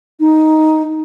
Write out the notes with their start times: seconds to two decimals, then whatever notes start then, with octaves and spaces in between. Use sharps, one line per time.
0.20 D#4